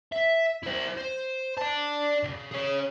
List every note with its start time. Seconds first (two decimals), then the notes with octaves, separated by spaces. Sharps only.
0.12 E5
0.63 E4 C5
0.97 C5
1.58 D5 A5
2.24 C2 C#3
2.52 G#4 C#5